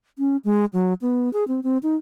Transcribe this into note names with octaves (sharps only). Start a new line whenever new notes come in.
C#4
G#3
F#3
B3
G#4
C4
C4
D#4